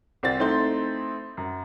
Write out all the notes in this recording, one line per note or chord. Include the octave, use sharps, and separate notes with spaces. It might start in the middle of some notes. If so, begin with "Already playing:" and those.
C2 C4 A6
A3 C4 D#4 E4 C6 G6
F#2